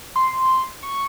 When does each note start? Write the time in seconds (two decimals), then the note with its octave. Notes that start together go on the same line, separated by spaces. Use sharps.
0.16 C6
0.83 C#6